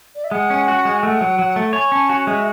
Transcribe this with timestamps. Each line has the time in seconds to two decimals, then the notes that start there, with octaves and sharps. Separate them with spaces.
0.15 D5
0.24 E5
0.31 G#3 F#5
0.50 C#4
0.68 F#4
0.85 G#3
0.95 G#5
1.03 A3 F#5
1.21 F#3
1.39 F#3
1.56 A3
1.73 C#5 G#5
1.92 C#4 A5
2.09 F#4 G#5
2.27 G#3 E5